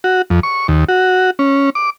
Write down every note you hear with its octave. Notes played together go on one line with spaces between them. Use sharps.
F#4
F2
C#6
D#2
F#4
C#4
D6